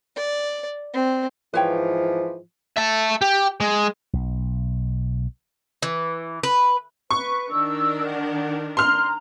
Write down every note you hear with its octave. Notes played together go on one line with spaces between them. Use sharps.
D5
C4
G#2 E3 F3 B4 C#5 G5
E5 A5
G4
G#3
B1
E3
B4
B4 C#6
D#3 D4 A#4 E6
F#5
A#5 C6 F6